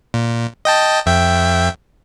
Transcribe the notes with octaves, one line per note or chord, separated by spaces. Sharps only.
A#2
D#5 G5 A5
F2 E5 G5